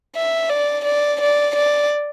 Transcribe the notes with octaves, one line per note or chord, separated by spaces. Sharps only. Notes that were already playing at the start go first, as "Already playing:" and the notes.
E5
D5
D5
D5
D5